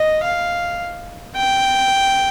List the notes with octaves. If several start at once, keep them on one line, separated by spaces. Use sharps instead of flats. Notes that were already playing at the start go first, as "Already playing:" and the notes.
Already playing: D#5
F5
G5